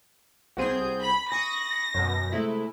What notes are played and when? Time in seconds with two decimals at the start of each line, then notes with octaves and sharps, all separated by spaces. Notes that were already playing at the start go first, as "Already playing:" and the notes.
0.57 C2 C4 G#4 F#5 G6
1.01 B5
1.32 G#5 B5 C#6 D#6 A#6
1.94 F#2 B2
2.32 C3 G#3 A3 E4